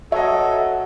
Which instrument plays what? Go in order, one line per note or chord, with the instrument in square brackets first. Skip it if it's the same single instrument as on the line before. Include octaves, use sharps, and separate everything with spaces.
[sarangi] F#3 [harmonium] A4 [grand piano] C#5 D#5 [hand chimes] E5